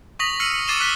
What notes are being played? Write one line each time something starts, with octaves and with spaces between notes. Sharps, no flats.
C#6 D#6 A#6 B6 F7 F#7
E6 F6 C7 C#7 D#7 F#7
C#7
D6 A6 C7 D#7 E7 G7
E6 F#6 B6 C#7 E7 G7